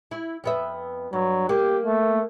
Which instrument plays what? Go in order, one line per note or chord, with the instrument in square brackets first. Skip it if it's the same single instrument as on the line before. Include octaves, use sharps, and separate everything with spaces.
[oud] E4
F2 B3 E5
[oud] G2 [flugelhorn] F#3
[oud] A#3 [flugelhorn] G4
[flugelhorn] A3